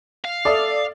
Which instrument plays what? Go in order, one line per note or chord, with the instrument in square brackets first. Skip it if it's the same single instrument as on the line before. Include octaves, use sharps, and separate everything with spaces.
[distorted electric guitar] F5
[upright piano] A4 E5 D#6 [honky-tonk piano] D5